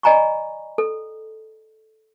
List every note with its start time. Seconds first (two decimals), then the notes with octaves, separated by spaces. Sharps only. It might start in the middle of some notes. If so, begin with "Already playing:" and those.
0.03 D5 D#5 G#5 A#5 B5 C#6
0.78 A4